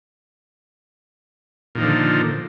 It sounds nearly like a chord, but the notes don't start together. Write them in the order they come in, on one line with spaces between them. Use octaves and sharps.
A#2 D#3 F3 D3